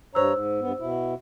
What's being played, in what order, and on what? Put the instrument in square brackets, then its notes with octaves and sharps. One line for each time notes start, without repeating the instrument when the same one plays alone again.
[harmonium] G2 C#5 A#5 [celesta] C5 E6
[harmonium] G#2
G2 B3
B2 E4